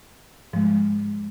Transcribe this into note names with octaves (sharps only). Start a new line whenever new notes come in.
G#2 F3 G#3